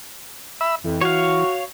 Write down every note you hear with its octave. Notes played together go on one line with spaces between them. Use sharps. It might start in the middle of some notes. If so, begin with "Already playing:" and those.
E5 B5 E6
F2 E3
F#4 C#5 F5